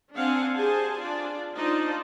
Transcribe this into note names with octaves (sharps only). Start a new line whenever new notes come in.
C4 D4 F5 F#5 G#5
G4 G#4 C5 G#5 A5
D4 F4 D5
D4 D#4 F4 C5 D5 A5